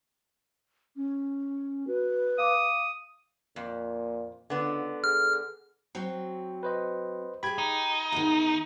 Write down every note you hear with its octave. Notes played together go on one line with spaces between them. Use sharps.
C#4
F#4 B4
F5 D6 D#6
F2 A#2
C#2 D3 B3
G#4 F6
F#3 C4
B4 C5 D#5
G4 G#4 B5 G#6
D#4
E2 D#3